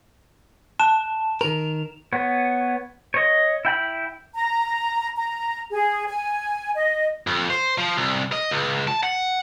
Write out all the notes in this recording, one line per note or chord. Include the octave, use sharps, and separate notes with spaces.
A5 E7
D#3 A#4 F7
B3 C#5
C#5 D#5
E4 G5 B5
A#5
A#5
G#4
G#5
D#5
F2
C5
F3
C2
D#5
C#2
A5
F#5